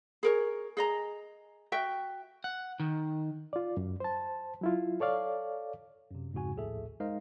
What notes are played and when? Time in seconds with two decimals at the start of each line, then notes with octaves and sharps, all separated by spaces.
0.23 G#4 A#4 C#5
0.77 G#4 D#5 A#5
1.72 F#4 E5 G5
2.44 F#5
2.80 D#3
3.53 F4 D5
3.77 F#2
4.00 C5 A5
4.61 F#3 E4 F4
5.00 A4 C#5 D5 F5
6.11 F#2 C3
6.33 F2 G#2 C#3 F#4 G#5
6.56 A#1 D#2 A2 G#4 A4 E5
7.00 G#3 D#4 A#4 C5 D#5 F5